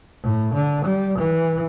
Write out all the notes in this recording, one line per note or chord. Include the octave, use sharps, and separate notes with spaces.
A2
D3
G3
E3